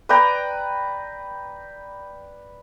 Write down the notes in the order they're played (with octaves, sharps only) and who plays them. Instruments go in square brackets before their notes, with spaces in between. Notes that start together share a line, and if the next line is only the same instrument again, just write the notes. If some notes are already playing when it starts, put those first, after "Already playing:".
[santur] B4 D5 G5 A#5